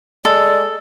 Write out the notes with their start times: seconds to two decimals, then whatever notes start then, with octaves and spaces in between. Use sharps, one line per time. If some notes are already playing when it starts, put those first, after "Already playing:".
0.25 G#3 A4 D5